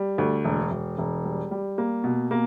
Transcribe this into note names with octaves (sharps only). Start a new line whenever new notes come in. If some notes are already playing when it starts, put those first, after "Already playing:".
Already playing: G3
D2
E1
E1
E1
G3
G3
A#3
B2
A#3